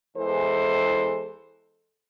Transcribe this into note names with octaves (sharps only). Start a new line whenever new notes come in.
E2 E3 G#3 A4 C5